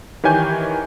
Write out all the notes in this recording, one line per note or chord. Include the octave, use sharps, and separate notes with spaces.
D#3 E3 G4 C#5 G#5 G6